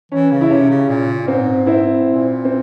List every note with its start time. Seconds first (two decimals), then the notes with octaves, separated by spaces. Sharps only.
0.12 E3 C#4
0.31 C#3
0.41 E4
0.50 C3 C#4
0.70 C#3
0.89 A#2
1.27 G#2 C4
1.66 C4 E4
2.06 A#2
2.45 C4